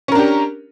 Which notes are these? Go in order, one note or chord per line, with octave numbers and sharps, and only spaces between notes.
C#4 D4 G4 A#4